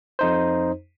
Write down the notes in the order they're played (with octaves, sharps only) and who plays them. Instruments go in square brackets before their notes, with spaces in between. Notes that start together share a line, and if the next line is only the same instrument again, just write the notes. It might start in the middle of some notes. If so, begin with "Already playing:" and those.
[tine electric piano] F2 D#4 C5